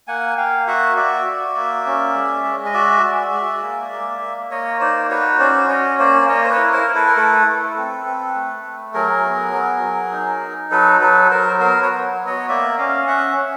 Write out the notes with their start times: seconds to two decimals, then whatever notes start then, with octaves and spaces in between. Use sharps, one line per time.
0.07 A#3 F#5 G#5
0.37 A#3 F5 G5
0.67 F#4 E5 F#5
0.96 F#4 D5 E5
1.26 F#4
1.55 A#3
1.86 C#4
2.14 G#3
2.44 G#3
2.66 D#5
2.74 F#4 D5 E5
3.03 G#3
3.33 G#3
3.62 A#3
3.92 A#3
4.21 A#3
4.50 A#3 C#5 D#5
4.80 D#4 C5 D5
5.10 F#4 B4 C#5
5.39 C#4 C5 D5
5.69 C#4 C#5 D#5
5.99 A#3 C5 D5
6.29 A#3 C#5 D#5
6.44 C5
6.50 B4 C#5
6.57 E4
6.72 A#4 C5
6.87 E4
6.95 A4 B4
7.06 A#4
7.16 A3 A4 B4
7.47 A3
7.77 C4
8.05 C4
8.35 A3
8.65 A3
8.94 F#3 G#4 A#4
9.24 B3
9.53 F#3
9.83 F#3
10.12 D#4
10.42 D#4
10.71 F#3 A4 B4
11.00 F#3 A4 B4
11.30 F#3 A#4 C5
11.59 B3 A#4 C5
11.82 B4 C#5
11.89 F#3
12.19 B3
12.26 C#5 D#5
12.49 A#3 D5 E5
12.78 C#4 D#5 F5
13.07 C#4 E5 F#5
13.37 C#4